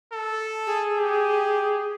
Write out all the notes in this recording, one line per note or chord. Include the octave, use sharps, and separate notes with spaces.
A4
G#4
G4